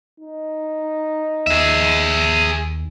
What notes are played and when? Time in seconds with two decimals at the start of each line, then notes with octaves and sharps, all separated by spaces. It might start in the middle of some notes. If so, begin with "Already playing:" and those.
0.20 D#4
1.47 D#2 G#4 E5